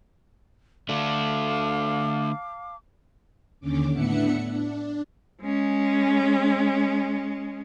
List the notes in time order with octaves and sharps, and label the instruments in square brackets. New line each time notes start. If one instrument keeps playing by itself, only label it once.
[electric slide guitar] D3 A3 D4 [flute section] F5 A5 D6
[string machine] D#2 D3 C#4 D6
A2 B3 D4 E5 F#5 C#7
D4
[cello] G#3 C#4